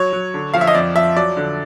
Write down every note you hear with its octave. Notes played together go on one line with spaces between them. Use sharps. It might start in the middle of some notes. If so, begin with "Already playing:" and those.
Already playing: F#3 C#5
F#3
D3
F3 F5
E5
D#5
F2 D5
F3 E5
F#3 D5
D3